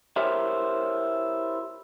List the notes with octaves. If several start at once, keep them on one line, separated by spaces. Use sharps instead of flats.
E4 G4 A#4 C5 C#5 E5